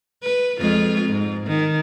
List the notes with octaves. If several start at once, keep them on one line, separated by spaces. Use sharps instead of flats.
B4
F2 G#3 F4
G#2
D#3